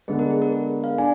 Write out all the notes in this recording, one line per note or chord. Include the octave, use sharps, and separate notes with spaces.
D3 G#3 B3 G#4
A#4
G#4
A#4
A#4
F5
D4 G#5